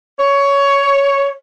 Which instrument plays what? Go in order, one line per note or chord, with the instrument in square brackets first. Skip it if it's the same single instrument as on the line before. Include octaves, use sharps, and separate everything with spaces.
[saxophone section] C#5